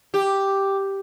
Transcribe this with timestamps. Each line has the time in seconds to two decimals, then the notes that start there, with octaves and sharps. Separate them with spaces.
0.14 G4